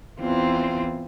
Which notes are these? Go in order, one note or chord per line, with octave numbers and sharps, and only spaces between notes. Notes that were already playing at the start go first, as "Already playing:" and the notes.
E2 E3 C4 F4